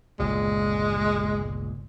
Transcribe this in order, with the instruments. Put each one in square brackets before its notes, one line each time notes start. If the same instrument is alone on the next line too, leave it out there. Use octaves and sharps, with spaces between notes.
[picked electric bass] G1 C#2 A#2 [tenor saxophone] G#3